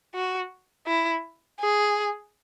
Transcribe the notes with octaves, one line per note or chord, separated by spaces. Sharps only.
F#4
E4
G#4